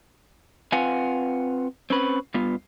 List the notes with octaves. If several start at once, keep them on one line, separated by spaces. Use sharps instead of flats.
C4 F4 B4 F5 F#5 G#5
C4 C#4 B4
G2 B3 F4